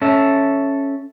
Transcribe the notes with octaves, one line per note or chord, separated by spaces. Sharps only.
C#4 A4 E5